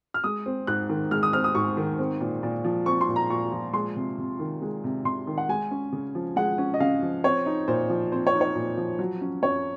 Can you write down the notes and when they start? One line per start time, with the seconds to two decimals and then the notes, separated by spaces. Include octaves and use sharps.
0.14 F6
0.24 G#3 D#6
0.46 C4
0.67 G#2 F#6
0.89 D#3
1.11 G#3 F6
1.23 D#6
1.33 C4 F6
1.44 D#6
1.55 G#2 C#6
1.77 D#3
1.99 C4
2.21 A#2
2.43 A#2
2.65 F3
2.86 C4 C#6
3.01 C6
3.09 A#2
3.16 A#5
3.30 A#2 C#6
3.52 F3
3.73 G#3 C6
3.96 C3
4.18 C3
4.39 D#3
4.62 G#3
4.84 C3
5.05 C3 C6
5.27 D#3
5.38 F#5
5.49 G#3 G#5
5.71 C#4
5.92 C#3
6.15 F3
6.36 G#3 F#5
6.58 C#4
6.74 D#5
6.80 C#3 F5
7.03 F3
7.24 C4 C#5
7.46 D#4
7.68 A#2 C5
7.90 F3
8.12 C4 C5
8.27 C#5
8.34 D#4
8.41 C#5
8.56 A#2
8.78 F3
8.99 F#3
9.21 C#4
9.43 F#2 C#5